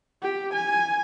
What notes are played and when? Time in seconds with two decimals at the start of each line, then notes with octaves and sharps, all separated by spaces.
0.23 G4
0.53 G#5